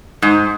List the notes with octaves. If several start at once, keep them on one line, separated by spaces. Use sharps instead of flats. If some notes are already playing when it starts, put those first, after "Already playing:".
G#2